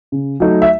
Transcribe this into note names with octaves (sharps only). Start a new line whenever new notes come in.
C#3
F#3 A3 D#4
E5